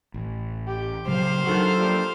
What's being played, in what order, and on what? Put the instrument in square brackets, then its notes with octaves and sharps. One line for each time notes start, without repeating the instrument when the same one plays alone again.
[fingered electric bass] A1
[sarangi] G4
[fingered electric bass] A#2 C#3 F#3 [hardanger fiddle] C5 F5
[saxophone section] D#3 F#4 [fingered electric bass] F#3 D4 [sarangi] A4
[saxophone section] A#2 F3 G3